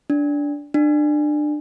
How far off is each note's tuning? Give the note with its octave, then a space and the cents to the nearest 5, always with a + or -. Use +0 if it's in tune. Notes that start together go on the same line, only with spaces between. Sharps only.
D4 -15
D4 +25